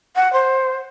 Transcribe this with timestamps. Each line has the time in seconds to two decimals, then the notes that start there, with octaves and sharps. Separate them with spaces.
0.16 F#5
0.33 C5